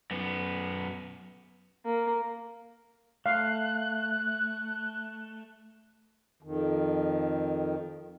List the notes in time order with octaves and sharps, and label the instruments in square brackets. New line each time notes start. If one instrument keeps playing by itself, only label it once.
[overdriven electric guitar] F#2 B3
[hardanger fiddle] A#3
[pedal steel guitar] A3 [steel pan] F5 [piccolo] F#6
[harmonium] F2 D#3